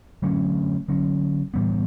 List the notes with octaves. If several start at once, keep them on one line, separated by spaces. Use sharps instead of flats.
D3 F#3 A3 C#4
D3 F#3 C#4
A2 E3 G3 B3